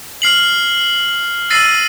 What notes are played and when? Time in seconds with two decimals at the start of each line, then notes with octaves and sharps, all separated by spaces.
0.22 F6 C7 F#7
1.50 E6 A6 A#6 C7 D#7